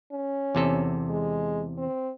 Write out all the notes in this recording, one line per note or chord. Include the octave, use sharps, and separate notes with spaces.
C#4
E2 C3 A4
G#3
C4